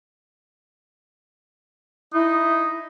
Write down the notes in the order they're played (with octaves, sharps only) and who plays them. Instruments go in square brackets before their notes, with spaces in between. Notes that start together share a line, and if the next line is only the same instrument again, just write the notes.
[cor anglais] D#4 [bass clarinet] E4